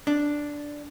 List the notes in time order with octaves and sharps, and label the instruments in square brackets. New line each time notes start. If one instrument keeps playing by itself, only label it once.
[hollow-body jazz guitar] D4